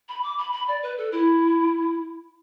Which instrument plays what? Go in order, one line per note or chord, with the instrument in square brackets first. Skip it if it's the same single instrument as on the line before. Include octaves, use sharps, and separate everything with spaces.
[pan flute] B5
D6
B5
B5
D5
B4
A4
E4